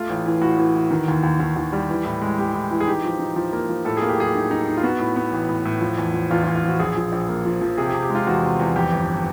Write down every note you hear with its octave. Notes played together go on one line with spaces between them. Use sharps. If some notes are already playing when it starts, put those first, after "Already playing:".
Already playing: A3 F4
A1
E3
A2 F#4
E3
E3
D#3
D#2
D#2
D#2
D#2
G3
E3
A2
G#3
G#3 G4
A2
E3
G#4
D#4 G4
F3
D#4
F3
A#3
F3
A2 A4
A#3 G#4
G4
F#3 G#4
D#4
D#4
D#4
F4
B3 F#4
A2
B3
A1
A2
A2
F3
E2
F3
E2 F4
F4
E2
F4
F3 F#4
A#1 G#4
F3
A#1
A#3
F3
F3
C3 G#4
G4
G#4
C3
G4
G#3 F4
E2 F#4
C3
E2
F2 G4
G1